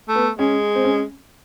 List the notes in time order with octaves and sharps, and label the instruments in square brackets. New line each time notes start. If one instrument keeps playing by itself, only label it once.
[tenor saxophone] A3
[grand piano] B3
[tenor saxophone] G#3 [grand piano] C#4
[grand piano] C4
C#4